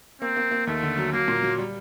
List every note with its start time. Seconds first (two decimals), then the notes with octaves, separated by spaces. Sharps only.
0.22 A#3 C4
0.36 A#3
0.51 A#3
0.67 D#2 A3
0.83 D3
0.98 F#3
1.13 F#3 A#3
1.28 A#2
1.43 F#3
1.58 G3